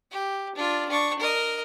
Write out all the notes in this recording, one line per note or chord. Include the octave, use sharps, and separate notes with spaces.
G4
D4 F4
D4 C#6
A#4 D#5